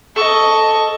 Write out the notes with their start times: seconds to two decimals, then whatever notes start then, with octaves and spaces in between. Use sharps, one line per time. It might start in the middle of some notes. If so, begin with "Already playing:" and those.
0.16 A4 D#5 C#6